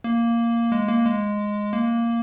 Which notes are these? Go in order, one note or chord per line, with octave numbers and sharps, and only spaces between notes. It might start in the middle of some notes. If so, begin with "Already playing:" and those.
A#3
G#3
A#3
G#3
A#3